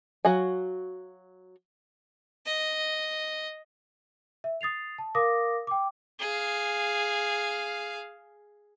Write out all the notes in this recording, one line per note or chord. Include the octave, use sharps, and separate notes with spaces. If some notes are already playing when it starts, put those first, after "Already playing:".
F#3 F#4 F5 G#5
D#5
E5
D#6 A6 C7 F7
A5
A#4 F5 D6 D#6 A#6
G5 D6
G#4 F5